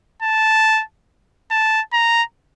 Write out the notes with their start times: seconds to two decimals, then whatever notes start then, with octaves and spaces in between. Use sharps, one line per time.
0.22 A5
1.51 A5
1.93 A#5